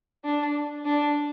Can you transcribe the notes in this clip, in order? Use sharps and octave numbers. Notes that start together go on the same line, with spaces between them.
D4
D4